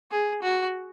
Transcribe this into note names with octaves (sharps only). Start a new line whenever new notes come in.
G#4
F#4